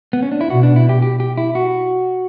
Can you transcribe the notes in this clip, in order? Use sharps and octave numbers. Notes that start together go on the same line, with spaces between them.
B3
C#4
D4
E4
B2 F#4
D4
E4
G4
G4
G4
E4
F#4